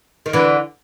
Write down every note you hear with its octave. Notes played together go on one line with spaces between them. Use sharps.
D#3
D3 E3